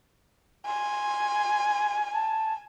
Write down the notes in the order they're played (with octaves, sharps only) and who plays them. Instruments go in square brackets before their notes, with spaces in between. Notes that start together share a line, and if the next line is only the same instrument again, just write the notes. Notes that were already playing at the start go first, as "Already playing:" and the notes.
[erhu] G#5 [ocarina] C6
[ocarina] A5